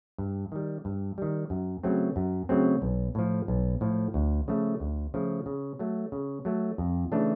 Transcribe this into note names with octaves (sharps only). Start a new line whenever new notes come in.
G2
D#3 G3
G2
D#3 G3
F#2
C#3 F#3 A3 C4
F#2
C#3 F#3 A3 C4
B1
A2 F3
B1
A2 F3
D2
C#3 F3 A3
D2
C#3 F3 A3
C#3
F#3 A3
C#3
F#3 A3
F2
C#3 E3 A3 D4